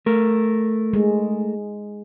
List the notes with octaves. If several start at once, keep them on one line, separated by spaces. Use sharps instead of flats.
A3 A#4
G#3